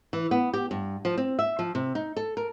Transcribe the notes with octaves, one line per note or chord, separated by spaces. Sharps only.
E3
B3
G4
G2
F3
C4
E5
F3
C3
D#4
A4
A#4